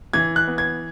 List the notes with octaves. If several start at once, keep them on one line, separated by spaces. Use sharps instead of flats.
E3 G#6
F#6
B3
G#6